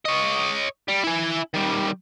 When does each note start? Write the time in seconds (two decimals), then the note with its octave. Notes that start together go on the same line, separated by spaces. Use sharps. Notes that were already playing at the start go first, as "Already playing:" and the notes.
0.05 C#5 D#5
0.88 G3
1.04 E4 G#5
1.54 D#3 G3